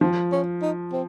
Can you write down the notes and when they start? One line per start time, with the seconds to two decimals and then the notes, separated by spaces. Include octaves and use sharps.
0.01 F3 C4
0.32 C#4
0.62 D#4
0.93 C4